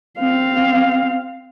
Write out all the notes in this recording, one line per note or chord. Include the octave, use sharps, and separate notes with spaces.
C4 F5